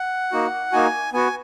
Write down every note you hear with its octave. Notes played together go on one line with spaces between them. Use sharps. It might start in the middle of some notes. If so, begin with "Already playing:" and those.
Already playing: F#5
A#3 D#4 F#4
A#3 D#4 F#4 G#5
B3 F#4 G#5